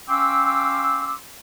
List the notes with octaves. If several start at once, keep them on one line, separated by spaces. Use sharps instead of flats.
C#4 F5 G5 C6 D6 E6